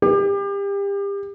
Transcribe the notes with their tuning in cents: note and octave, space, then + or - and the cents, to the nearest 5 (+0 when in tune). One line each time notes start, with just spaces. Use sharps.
G4 +30